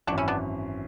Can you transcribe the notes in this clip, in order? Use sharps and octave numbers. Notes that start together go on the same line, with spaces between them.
G#1 F#2 E3 D4 F#4
C#4 E4
B3 D4